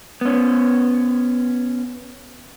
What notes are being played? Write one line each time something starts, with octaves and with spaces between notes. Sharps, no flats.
B3 C#4